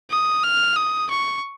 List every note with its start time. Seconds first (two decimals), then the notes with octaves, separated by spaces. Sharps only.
0.11 D#6
0.44 F6
0.76 D#6
1.10 C#6